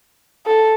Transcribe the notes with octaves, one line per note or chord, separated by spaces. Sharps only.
A4